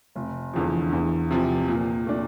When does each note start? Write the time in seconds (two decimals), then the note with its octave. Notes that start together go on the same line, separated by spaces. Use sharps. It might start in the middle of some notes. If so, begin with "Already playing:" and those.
0.15 F1
0.54 E2 D3 F3
0.92 E2
1.30 C3 F3
1.68 A#2
2.06 A3 D4